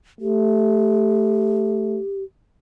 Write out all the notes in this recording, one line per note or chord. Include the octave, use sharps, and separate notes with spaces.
A3 G4